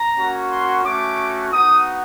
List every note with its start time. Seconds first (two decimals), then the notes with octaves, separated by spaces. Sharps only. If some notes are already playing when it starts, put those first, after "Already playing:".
Already playing: A#5
0.16 A#3 C#4 F#4
0.50 C6
0.83 A3 C#4 F#4 D6
1.51 B3 D#4 F#4 D#6